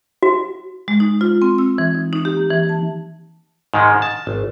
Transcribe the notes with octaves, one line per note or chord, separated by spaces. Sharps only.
F#4
G#3
D#4
F4
C4
E6
E3
D#4
D#4
G4
A#3
E3
A5
G#2 D#3 G#3
A5
G#1